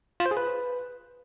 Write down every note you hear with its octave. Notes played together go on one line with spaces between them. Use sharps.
F4
C5
G#4
B4